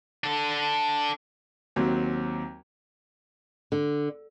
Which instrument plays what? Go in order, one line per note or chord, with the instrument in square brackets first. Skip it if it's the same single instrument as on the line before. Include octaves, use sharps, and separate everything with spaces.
[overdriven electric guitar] D4 A4
[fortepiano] D#2 F#3 C4
[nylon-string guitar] D3